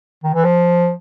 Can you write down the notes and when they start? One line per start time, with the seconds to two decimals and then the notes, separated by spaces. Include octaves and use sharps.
0.23 D#3
0.34 E3
0.44 F3